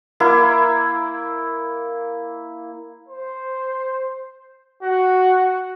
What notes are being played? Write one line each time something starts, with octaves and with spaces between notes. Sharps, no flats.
A#3 E4
C5
F#4